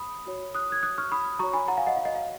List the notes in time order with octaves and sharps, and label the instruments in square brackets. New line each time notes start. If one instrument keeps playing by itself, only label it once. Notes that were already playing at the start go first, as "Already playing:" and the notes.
Already playing: [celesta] B5 D#6
F#4 C#5
D#6 F#6
G#6
D#6 F#6
C#6 F6
B5 D#6
F#4 C#5 A#5 C#6
G#5 B5
F#5 A#5
F5 G#5
D#5 F#5
F5
D#5
F5